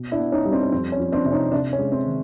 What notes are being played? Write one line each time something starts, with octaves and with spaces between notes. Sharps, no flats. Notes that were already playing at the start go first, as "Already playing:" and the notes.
Already playing: B2
D4 E4
B3
C#4 D#4
G3
C4 D4
C#4
F2 C4
C#4
F3
C4 D4
C3
C#4 D#4
C3 C4 D4
C#4
G#3
C4
D#3